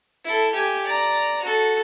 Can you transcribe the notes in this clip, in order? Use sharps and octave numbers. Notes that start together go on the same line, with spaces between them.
E4 A4
G4 G#5
D5 A#5
F#4 A4